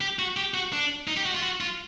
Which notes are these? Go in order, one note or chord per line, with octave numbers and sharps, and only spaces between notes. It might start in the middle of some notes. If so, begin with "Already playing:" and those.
G4
F#4
G4
F#4
D4
D#4
G4
F#4
F4
F#4
F4